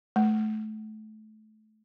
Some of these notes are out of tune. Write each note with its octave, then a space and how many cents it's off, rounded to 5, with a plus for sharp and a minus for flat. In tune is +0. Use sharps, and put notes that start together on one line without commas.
A3 -25